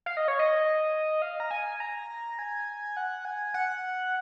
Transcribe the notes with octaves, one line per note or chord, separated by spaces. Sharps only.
F5
D#5
C#5
D#5
F5
A#5
G#5
A#5
G#5
F#5
G#5
F#5